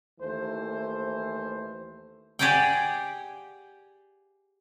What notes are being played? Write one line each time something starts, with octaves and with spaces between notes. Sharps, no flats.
D#2 E3 A3 C5
G4 G#4 D5 F#5 G5